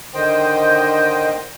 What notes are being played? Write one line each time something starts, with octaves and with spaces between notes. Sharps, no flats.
D3 D#3 C5 D#5 G5